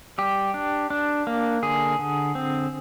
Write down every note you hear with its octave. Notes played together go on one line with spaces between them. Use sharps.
G3 G4
D4
D4
A#3
D3 G#4
D3
C4